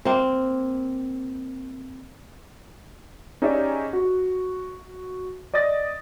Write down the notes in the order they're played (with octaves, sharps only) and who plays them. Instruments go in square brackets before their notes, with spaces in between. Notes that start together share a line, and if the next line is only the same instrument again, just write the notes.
[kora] A#3 C4
[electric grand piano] C#4 D#4 G4 G#4 D5 E5
F#4
D5 D#5 D#6 A6 A#6